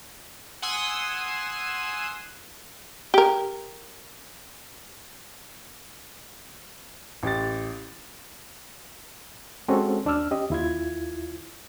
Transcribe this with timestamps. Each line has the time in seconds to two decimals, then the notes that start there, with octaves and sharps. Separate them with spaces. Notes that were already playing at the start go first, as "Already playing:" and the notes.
0.62 F#5 G#5 C6 D#6 E6
3.14 G4 A#4
7.23 A1 G4 A6
9.68 G#3 C4 C#4 F#4 A4
10.05 D#2 D4 D5 E6 F6
10.31 C#4 G4 D#5
10.50 D#2 E4 F4 G#6